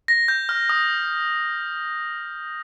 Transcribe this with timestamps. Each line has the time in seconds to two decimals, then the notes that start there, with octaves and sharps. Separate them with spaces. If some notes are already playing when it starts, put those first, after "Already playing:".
0.08 A#6
0.28 G6
0.49 F6
0.69 D#6